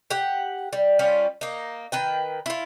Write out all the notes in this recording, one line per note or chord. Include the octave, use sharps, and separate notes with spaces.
G4 F#5
G3
G3 C#4 F4
A#3 D#4
D#3 B4 G5
E4 F4